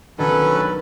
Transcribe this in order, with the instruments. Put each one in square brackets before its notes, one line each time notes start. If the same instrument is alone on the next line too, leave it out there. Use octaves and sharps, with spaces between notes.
[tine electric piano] B1 D4 [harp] D#3 [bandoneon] F#3 C#4 A4 [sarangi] B4